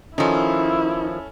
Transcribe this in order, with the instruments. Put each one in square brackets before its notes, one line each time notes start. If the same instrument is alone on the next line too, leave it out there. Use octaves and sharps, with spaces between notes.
[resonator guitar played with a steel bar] D#3 F3 [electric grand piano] C#4 A4 G#5 [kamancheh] E4